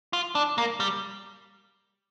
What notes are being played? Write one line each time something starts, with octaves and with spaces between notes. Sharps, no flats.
F4
D4
A#3
G3